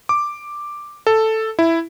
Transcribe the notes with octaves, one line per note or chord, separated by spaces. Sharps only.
D6
A4
E4